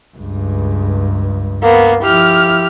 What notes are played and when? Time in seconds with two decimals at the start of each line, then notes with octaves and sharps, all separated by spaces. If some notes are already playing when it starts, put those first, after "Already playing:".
0.17 C#2 G2
1.63 A#3 B3
2.03 F3 E4 G4 F6